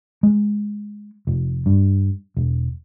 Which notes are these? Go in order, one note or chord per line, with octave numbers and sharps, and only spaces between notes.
G#3
F1
G2
E1